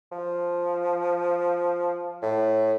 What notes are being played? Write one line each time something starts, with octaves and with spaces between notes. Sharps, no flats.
F3
A2